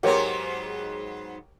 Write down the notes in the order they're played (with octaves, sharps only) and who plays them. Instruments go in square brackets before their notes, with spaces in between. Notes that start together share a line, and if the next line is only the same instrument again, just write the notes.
[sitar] G#2 F#3 B3 [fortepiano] G4 A#4 C#5